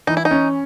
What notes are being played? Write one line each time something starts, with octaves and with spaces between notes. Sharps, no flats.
E3 D#4
E4
D#4
C#4